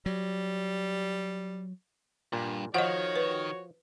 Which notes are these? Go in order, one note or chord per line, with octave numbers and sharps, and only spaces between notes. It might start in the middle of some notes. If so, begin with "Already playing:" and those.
F#3 G3
G2 A#2
D#3 F3 F#4 C#5 D#5 F#5
B4